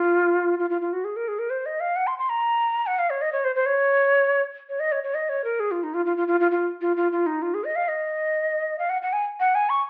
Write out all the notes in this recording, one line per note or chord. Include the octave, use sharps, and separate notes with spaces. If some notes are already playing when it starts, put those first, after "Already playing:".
Already playing: F4
F4
F4
F4
F#4
G#4
A#4
G#4
A#4
C5
D#5
F5
F#5
C6
C6
A#5
F#5
F5
C#5
D#5
C#5
C5
C5
C#5
C#5
D#5
C#5
C#5
D#5
C#5
A#4
G#4
F4
D#4
F4
F4
F4
F4
F4
F4
F4
F4
F4
D#4
F4
G#4
D#5
F5
D#5
F5
F#5
F#5
G#5
F#5
G#5
C#6